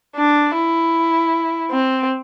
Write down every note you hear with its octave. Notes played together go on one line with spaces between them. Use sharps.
D4
E4
C4